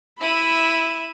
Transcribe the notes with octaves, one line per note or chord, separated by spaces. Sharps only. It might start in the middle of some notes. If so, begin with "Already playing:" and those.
E4 E5 B5 D#7